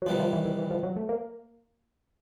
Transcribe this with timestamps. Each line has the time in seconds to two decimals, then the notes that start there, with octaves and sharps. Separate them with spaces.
0.02 F#3
0.06 C3 D#3 F3 G3 B3
0.20 F3
0.33 E3
0.45 E3
0.58 E3
0.71 F3
0.83 F#3
0.96 A3
1.09 A#3